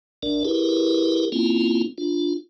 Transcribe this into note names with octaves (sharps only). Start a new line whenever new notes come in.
A1 D4 A#4 D5
E4 G4 G#4 A#4 B4
A#3 C4 C#4 E4 F4
D4 F4